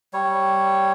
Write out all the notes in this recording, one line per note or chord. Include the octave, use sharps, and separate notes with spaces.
G3 C#5